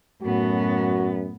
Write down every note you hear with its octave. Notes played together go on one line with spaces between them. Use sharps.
F#2 A2 B3 F#4